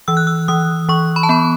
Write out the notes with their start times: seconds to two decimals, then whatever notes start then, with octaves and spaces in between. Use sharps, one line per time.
0.08 E3 E6
0.17 F#6
0.27 E6
0.48 E3 D#6
0.89 E3 C#6
1.16 B5
1.23 A5
1.29 B3 B5